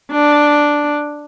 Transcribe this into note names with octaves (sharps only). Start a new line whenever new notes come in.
D4